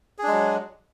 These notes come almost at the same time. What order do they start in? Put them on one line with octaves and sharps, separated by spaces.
G#4 D4 G#3 F#3